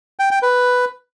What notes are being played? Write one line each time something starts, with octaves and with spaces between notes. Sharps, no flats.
G5
G5
B4